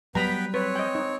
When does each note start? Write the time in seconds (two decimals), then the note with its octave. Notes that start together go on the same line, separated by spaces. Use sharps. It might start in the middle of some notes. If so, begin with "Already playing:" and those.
0.15 F#3 G3 B3 B4 G5 A#5 B5
0.54 C4 B4 C#5
0.75 D#5 G5
0.95 D#4